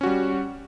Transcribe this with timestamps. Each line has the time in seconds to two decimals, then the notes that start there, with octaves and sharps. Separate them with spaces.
0.01 C#4
0.03 F#4
0.06 G3